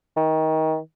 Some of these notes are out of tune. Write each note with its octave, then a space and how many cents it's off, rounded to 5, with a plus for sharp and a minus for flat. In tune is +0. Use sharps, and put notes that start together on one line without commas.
D#3 +25